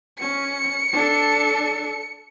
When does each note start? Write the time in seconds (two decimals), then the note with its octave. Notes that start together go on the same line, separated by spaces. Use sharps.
0.19 C#4 C#7
0.93 D4 A4